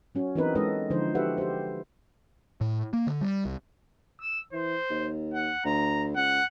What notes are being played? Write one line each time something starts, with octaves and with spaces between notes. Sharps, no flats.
F#3 C#4 F#4
E3 B3 C4 D#4 A#4 B4
G#3 C#4 D#4 A4 B4 D#5
D3 F3 D#4 E4 C5
F#4 G4 A4 B4 E5 F#5
G4 C5
A2
A#3
D3
G3
C2
E6
E3 C5
D#2
F#5
D2 A#5
C#2 F#5